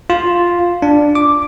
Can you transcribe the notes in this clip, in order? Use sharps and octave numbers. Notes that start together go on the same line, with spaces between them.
F4
D4
D6